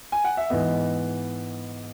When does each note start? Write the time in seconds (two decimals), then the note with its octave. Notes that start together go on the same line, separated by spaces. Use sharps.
0.12 G#5
0.24 F#5
0.37 E5
0.50 G#2 E3 B3 D#5